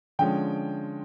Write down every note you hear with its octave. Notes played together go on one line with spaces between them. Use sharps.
D3 F3 G#3 C#4 G5